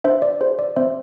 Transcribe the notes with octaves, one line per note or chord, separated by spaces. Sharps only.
D4 C5 E5
D5
G#4 C5
D5
C4 C5 E5